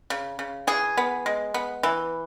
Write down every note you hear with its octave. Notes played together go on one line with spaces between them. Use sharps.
C#3
C#3
E3 G#4
B3
G#3
B3
E3